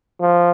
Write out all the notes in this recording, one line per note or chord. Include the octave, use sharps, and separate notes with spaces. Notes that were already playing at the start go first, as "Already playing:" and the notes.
F3